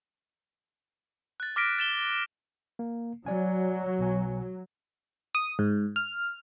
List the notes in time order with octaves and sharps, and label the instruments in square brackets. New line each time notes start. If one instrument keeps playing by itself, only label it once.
[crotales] F#6 A6
D6 F6 A#6 B6 D7
A6 E7 G7
[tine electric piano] A#3
[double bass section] F#3 [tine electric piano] D5 G#5
[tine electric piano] B1 B2 G#5
[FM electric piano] D#6
G#2
F6